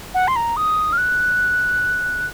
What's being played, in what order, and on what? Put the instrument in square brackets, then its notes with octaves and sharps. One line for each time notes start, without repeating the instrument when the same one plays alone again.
[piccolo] F#5
C6
A#5
D#6
F6
F#6